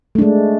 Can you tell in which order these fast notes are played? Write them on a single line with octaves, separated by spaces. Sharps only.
A3 D4 G#3